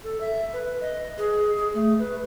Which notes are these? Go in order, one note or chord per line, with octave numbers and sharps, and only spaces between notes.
A4
E5
B4
D#5
G#4
G#4
A3
B4